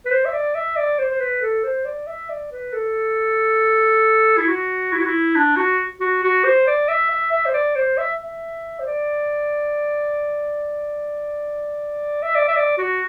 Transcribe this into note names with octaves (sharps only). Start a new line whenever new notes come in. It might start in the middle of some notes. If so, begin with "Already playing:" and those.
B4
C5
E5
D5
E5
D5
C5
C5
B4
A4
C5
D5
E5
D5
B4
A4
E4
F#4
E4
F#4
E4
D4
F#4
F#4
F#4
C5
D5
E5
E5
E5
C5
D5
C5
E5
E5
C5
D5
E5
D5
E5
D5
F#4